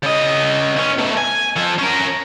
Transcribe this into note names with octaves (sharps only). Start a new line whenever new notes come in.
C#3 D#5
B1 C#4
B2 A3
G#5
F3 A4
C#4 A#4